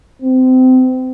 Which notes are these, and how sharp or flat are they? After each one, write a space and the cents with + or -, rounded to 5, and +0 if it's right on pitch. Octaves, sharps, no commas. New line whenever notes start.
C4 -25